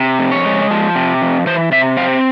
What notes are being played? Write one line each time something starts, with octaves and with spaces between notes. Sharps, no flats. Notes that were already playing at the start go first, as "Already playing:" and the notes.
Already playing: C3
F2
C#5
G#3
F3
C3
F2
E3 C5
C3 E5
C4 F5